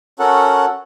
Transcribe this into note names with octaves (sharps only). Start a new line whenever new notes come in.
C#4 F#4 A4 A#4 F#5